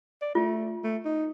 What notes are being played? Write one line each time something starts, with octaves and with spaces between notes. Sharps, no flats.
D5
A3 F4
A3
D#4